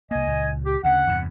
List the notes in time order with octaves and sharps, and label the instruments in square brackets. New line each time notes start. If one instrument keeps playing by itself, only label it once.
[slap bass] C2 A#3 [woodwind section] D#5 G#5
[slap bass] C#2 A#2
[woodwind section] G4
[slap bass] D2 C#3 [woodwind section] F#5
[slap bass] E2 G2 C3